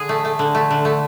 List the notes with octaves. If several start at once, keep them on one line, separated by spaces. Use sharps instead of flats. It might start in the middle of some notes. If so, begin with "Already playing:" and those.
Already playing: D3 G#4
A3
A3
D3
A3
D3
A3